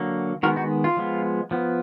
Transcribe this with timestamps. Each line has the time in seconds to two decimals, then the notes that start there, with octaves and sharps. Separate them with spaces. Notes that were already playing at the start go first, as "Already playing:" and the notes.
Already playing: D3 F#3 A#3
0.43 D#3 G#3 B3 F#4 A#4
0.56 D#4 F#4
0.84 F4
0.97 F3 G#3 B3
1.51 F3 B3